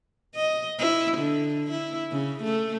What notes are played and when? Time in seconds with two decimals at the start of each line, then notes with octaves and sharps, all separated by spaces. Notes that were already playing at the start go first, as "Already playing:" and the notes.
0.35 D#5
0.79 E4
1.18 D3
1.71 E4
2.12 C#3
2.43 A3